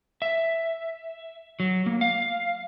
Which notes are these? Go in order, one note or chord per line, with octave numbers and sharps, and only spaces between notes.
E5
F#3
A#3
F5